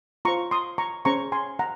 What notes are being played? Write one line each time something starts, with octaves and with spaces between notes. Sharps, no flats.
F4 C5 A#5 C#6
C6 D#6
A#5 C#6
C#4 G#4 C5 A#5 C#6
G#5 C6
F#5 A#5